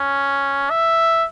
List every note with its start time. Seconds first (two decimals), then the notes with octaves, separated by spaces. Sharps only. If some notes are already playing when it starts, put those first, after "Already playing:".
Already playing: C#4
0.70 E5